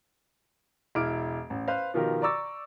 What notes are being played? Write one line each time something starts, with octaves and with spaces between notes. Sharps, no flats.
E1 E4 D6 F6 D7
A1
B4 C5 F5
B2 D#3 F3 F4 G4 A#4
D5 A#5 C#6 D6 E6 A6